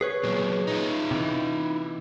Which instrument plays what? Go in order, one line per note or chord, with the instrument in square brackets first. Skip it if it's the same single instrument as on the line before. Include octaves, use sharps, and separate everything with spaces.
[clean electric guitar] G#4 B4 C#5
[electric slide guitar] A#2 F#3
D#4 F4
[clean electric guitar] C3 E3